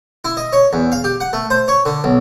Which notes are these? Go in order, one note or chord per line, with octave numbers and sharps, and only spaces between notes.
E4
D#5
C#5
E2
F5
G4
F#5
A3
C5
C#5
D3
B1